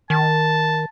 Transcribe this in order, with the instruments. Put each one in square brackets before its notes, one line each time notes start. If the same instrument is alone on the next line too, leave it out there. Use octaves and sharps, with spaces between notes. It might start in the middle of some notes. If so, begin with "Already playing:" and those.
[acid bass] D#3 [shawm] A5